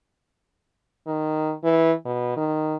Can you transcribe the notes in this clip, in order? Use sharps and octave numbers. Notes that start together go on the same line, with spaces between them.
D#3
E3
B2
D#3